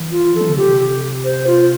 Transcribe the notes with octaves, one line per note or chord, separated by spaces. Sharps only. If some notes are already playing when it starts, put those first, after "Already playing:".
Already playing: E3
F4
F3 A4
E3
D3
C3 G4
C5
F4